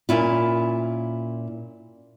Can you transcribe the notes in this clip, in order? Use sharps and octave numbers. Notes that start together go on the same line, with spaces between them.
A#2 C#4 E4 F4